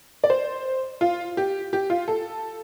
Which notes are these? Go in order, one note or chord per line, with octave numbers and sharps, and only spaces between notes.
D5
C5
F4
G4
G4
F4
A4